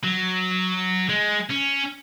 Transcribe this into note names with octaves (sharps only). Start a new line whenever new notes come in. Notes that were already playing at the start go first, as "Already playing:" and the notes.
F#3
G#3
C#4